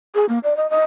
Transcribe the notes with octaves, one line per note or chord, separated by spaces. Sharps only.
G#4
A#3
D5
D#5
D#5